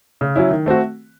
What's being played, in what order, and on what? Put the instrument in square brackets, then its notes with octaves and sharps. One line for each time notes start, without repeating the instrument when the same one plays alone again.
[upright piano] C#3
F#3 C#4 E4
D#3
A3 C4 F#4